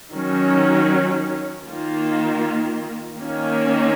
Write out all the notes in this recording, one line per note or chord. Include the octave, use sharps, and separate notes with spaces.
D#3 F#3 C#4
D#3 A#3 F4
D#3 A#3 C#4